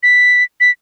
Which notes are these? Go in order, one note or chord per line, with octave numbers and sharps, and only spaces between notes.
B6
B6